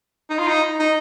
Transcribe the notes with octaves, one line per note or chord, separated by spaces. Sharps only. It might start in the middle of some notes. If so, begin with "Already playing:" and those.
D#4
F4
D#4
D#4